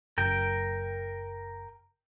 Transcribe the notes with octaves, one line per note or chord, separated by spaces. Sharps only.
F#1 A#4 G5